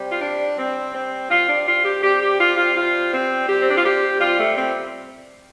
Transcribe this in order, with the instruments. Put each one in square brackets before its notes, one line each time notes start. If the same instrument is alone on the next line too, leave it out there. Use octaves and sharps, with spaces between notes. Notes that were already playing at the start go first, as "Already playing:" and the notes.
Already playing: [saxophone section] C3 G3
F4
D4
C3 G3 C4
C4
C3 G3 F4
D4
F4
G4
C3 G3 G4
G4
F4
F4
C3 G3 F4
C4
C3 G3 G4
C4
D4
F4
G4
C3 G3 F4
A3
C4